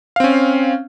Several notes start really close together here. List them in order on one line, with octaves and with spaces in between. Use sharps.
F5 C4 C#4